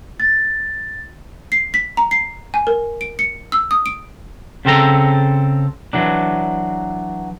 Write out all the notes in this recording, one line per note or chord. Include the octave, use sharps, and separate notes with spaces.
A6
C7
B6
A#5
C7
G#5
A#4
D7
C#7
E6
D#6
D7
C#3 C4 A4 A#5
E3 F#3 D4